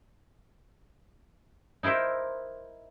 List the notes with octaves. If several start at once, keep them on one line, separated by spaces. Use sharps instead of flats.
D#4 E4 A#4 C5 E5